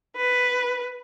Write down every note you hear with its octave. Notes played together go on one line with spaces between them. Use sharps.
B4